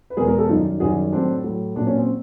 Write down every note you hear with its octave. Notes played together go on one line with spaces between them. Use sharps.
B4
E2 B2 G#3 G#4 A#4
G#4 A#4
G4 A4
F#2 D#3 G3 D#4 F4
F#2 D#3 G3 F#4 G#4
A2 F#3 C4 D4
A2 F#3
A#2 F#3 D4
C#4
C4